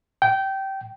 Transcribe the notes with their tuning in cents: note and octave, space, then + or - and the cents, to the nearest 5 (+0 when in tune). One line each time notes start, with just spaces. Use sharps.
G5 -20